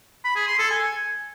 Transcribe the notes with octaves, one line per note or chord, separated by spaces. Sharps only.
B5
G#4
C6
A4
G#5